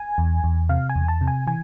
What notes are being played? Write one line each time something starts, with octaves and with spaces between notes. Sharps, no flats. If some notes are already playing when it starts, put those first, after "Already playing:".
Already playing: G#5
E2
E2
C3 F5
G#5
E2
A5
C3
G#5
E3 G#5